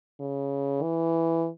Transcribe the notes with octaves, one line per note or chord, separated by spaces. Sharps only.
C#3
E3